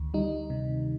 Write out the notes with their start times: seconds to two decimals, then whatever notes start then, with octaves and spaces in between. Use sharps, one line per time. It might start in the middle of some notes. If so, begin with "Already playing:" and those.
Already playing: D2 D#3
0.14 G3 D#4
0.50 C3